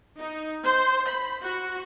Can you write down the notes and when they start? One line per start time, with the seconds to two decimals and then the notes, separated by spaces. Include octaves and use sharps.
0.18 D#4
0.64 C5
1.08 B5
1.42 F#4